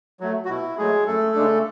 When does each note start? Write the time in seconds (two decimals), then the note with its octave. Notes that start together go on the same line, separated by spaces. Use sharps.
0.20 F#3 A3
0.45 F#4
0.49 B2 E4
0.77 F#3 G#3 A3 G#4
1.07 F#2 A3 A4
1.35 C#3 G#3 D4